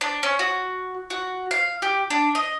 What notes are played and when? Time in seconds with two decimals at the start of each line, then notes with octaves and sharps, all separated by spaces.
0.01 D4
0.23 C#4
0.39 F#4
1.10 F#4
1.51 F5
1.82 G4
2.10 D4
2.35 D#5